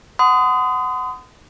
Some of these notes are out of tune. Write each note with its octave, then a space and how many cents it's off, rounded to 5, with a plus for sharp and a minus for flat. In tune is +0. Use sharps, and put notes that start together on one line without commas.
F#5 +0 C6 -40 D#6 +0